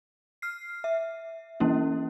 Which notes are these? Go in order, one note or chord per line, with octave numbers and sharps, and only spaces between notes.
F6 C7
E5
E3 A#3 C#4 E4